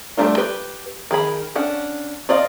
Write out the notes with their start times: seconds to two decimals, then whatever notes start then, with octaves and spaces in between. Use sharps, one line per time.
0.17 G3 A3 C4 D4 F4
0.37 G4 B4
1.11 D#3 G#4 B5
1.56 C#4 D4 F#5
2.29 F4 D5 D#5 F5